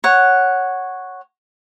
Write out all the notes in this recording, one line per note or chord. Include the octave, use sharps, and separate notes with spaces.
C#5 F#5